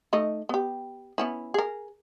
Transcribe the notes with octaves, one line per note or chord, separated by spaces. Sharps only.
A3 D#4 D#5
B3 G4
B3 C#4 E4
G#4 A#4